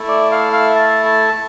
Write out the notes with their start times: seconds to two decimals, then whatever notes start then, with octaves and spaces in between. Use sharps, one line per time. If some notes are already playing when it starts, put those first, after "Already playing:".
Already playing: A3 E4
0.08 D5
0.31 F5
0.53 F5
0.75 A5
1.05 A5